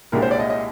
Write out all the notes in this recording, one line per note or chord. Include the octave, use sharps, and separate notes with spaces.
C2 A#2 G#3 D4 G4 A#4
C5
D5
D#5
D#5